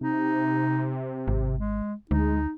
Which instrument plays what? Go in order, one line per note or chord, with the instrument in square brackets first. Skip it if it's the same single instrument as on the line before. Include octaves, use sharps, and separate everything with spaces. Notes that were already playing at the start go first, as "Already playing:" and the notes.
[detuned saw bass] C3 [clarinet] D#4
[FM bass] G#1
[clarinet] G#3
[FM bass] D2 [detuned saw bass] G#3 [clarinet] D#4